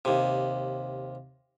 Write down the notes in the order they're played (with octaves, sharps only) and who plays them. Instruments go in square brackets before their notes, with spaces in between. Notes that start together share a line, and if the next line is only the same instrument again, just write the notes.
[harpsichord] D#2 C3